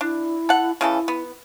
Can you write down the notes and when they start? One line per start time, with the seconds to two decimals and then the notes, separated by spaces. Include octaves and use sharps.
0.01 D4 E4
0.49 A4 F#5
0.81 C#3 E3 E4 A4
1.08 B3